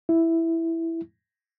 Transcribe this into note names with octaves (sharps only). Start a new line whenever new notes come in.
E4